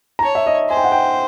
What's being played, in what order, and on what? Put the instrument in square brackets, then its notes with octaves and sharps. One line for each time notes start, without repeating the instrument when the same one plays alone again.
[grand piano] A#5
[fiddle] C#5 [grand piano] A5
[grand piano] E5
D#5
[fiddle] C5 [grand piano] G#5
[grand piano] G5
F#5
G5